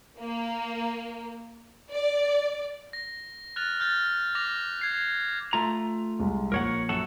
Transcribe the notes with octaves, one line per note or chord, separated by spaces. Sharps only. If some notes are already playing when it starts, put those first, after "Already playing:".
A#3
D5
A#6
F6 F#6 A6 F7
F6 G6 A6
D6 A#6 F7
G#6 C7 F7
A3 F4 A#5
C2 G#3
A#1 A#4 C#5 F#5
F#2 F#4 A4